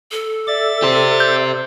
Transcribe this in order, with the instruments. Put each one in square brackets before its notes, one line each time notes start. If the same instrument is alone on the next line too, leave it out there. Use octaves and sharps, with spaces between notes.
[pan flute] A4
[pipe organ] D5 E5 A6
[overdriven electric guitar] G4 C5
[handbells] G6